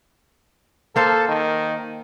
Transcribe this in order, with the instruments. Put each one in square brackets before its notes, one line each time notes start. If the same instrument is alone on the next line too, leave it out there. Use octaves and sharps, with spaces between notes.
[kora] A#3 C5 F5 [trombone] A4
[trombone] D#3